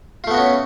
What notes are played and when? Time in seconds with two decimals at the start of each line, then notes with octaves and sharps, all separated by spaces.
0.24 F4
0.27 A3
0.31 B3
0.34 F#4
0.37 C#4